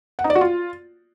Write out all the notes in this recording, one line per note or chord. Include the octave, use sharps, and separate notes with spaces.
F#5
D#4
D5
F#4
F4